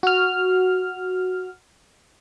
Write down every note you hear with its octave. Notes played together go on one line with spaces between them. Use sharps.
F#4 F6